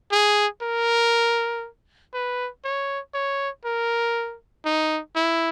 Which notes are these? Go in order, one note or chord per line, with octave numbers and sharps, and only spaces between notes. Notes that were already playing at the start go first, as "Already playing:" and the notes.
G#4
A#4
B4
C#5
C#5
A#4
D#4
E4